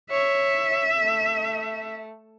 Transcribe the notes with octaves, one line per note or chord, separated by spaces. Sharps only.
C#5 E5
A3